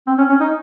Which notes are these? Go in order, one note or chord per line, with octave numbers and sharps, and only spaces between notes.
C4
C#4
C#4
D#4